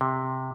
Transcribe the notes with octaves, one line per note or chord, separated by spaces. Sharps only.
C3